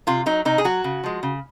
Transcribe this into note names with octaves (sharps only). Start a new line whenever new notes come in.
C3 F4
F#3 D#4
C3 D#4
G#4
F#3 F#4
C#3
F3 G#3
C#3